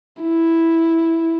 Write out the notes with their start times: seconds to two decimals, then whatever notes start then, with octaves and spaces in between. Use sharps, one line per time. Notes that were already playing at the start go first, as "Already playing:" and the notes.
0.21 E4